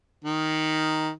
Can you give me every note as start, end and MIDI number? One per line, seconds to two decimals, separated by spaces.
0.24 1.11 51